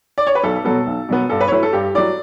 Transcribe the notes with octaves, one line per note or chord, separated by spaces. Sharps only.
D5
C#5
B4
B1 A4
B2 F#3 B3 A4
B1
B2 F#3 B3
G2 A4
B4
C#5
F#3 A3 E4 B4
A4
G2 G4
F#3 A3 E4 D5